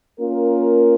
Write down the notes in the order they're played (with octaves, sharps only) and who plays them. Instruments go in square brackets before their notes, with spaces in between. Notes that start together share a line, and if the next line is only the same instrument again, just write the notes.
[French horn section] A#3 C#4 F4 A#4